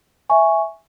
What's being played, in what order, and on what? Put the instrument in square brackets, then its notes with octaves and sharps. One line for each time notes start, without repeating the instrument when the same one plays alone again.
[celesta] E5 G#5 C#6